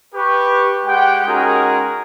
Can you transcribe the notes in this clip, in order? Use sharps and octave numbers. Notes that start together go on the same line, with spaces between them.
G4 B4 C#6
G#3 G4 F#5 G5
G#3 C#4 D#4 F#4 G#4 A#4